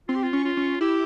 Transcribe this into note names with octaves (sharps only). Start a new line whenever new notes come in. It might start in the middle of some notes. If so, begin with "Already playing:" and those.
C4 F4
G4
F4
C#4
F4
C#4
E4 G4